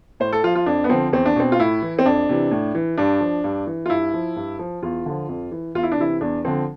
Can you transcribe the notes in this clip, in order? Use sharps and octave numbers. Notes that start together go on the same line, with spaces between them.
A2 C5
A4
F3 F4
F4
F2 D4
B3
D3 F3 C4
E2 C4
D4
B2 C4
F4
A2 E4
E3
C4
F2 D4
C3 E3
A2
E3
G2 D4
F3
G2
E3
F4
G2 E4
F3
G2
F3
E2 F4
D3 F3
F2
E3
E2 F4
E4
D4
C3 E3 E4
E2 D4
D3 F3 C4